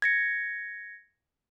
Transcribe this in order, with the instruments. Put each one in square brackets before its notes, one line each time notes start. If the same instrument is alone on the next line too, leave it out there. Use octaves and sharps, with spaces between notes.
[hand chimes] G#6 A#6 C#7